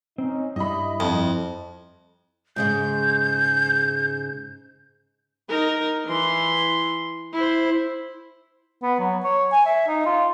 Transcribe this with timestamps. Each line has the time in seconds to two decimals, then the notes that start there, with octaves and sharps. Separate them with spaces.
0.18 C4 C#4 D#4
0.56 G2 G3 E4 D#5 B5
1.00 F2
2.56 G#2 C#3 G#3 G6
5.49 D#4 A#4
6.06 E3 C6
7.33 E4 C5
8.82 B3
8.99 F#3
9.24 C#5
9.52 G#5
9.66 E5
9.87 D#4
10.06 F4